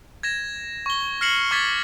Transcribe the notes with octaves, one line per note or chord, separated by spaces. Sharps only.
G#6 A#6 E7
C#6 G7
F6 A#6 C7 C#7 E7 F#7
C#6 D6 G#6 A6 B6 G7